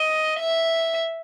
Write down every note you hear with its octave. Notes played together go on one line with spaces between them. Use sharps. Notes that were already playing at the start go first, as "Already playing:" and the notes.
Already playing: D#5
E5